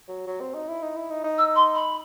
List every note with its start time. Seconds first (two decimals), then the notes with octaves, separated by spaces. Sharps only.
0.09 F#3
0.27 F#3
0.41 C4
0.55 D#4
0.68 E4
0.82 D#4
0.96 E4
1.10 D#4
1.24 D#4
1.38 E6
1.56 C6
1.74 B5